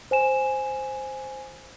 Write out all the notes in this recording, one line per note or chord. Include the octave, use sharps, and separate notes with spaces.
C5 G#5 E7